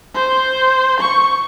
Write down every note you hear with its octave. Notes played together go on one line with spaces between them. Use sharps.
C5
C#6